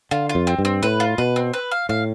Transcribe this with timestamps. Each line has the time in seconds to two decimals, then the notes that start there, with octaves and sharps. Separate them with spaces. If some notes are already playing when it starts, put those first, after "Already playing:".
0.11 D3 F4
0.29 F4
0.35 F2
0.47 C4
0.58 G2
0.65 C4
0.83 A2 B4
1.00 F4
1.18 B2 B4
1.36 C4
1.53 B4
1.71 F5
1.89 A2 F5